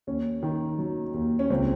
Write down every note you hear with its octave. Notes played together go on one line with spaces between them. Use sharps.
D#2 C#4
D#3
F#3
D#2
C#4
C#2 C4